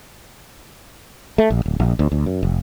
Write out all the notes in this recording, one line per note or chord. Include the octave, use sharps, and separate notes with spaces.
A3
A#1
D1
A#1
D2
D2
F#2
F1